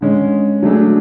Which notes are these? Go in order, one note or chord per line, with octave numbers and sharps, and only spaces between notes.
D3 G#3 C#4
F#3 A3 D4 G#4